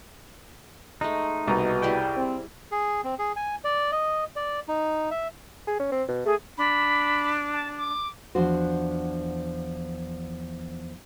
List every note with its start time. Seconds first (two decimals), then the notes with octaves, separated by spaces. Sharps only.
1.01 G#3 A3 D#4
1.47 C2 B2 A#5
1.82 G3 E4 G#4 G5
2.17 C4
2.72 G#4
3.04 C4
3.19 G#4
3.36 G#5
3.64 D5
3.92 D#5
4.36 D5
4.68 D#4
5.11 E5
5.67 G#4
5.80 C#4
5.92 C4
6.09 B2
6.26 A3 G#4
6.57 D4 B5
7.53 A5
7.77 D6
8.35 E2 F3 D4 F#4 C5